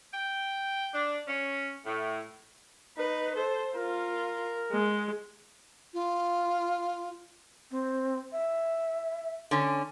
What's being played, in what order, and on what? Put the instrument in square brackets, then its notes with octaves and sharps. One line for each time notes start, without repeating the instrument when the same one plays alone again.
[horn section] G5
D4
C#4
A2
[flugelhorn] D#4 [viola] B4
[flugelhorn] A4 [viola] C5
[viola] F4 [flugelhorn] A#4
[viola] G#3
[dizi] F4
[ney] C4
E5
[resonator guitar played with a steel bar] D3 C#4